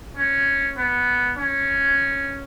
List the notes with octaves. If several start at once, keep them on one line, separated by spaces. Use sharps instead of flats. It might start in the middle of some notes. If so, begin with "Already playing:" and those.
C#4
B3
C#4